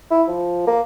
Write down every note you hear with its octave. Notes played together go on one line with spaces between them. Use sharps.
E4
F3
A#3